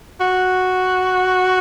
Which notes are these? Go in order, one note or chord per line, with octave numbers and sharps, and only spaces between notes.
F#4